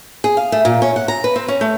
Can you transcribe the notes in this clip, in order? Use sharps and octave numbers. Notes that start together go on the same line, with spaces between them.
G#4
F5
A3
A#2
C#4
F#5
A#5
B4
C4
C#4
A3